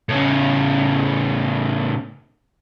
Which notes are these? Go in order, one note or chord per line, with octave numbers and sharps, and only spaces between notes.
A2 C#3